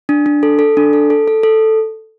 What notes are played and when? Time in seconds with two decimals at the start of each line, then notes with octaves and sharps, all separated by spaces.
0.09 D4
0.26 D4
0.43 A4
0.59 A4
0.77 D4
0.93 A4
1.10 A4
1.28 A4
1.43 A4